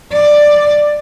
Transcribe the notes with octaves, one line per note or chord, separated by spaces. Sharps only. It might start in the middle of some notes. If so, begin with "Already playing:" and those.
D5